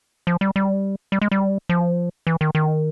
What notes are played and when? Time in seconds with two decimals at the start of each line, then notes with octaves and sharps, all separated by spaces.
0.27 F3
0.41 G3
0.56 G3
1.12 G3
1.21 G#3
1.31 G3
1.69 F3
2.27 E3
2.41 D#3
2.55 D#3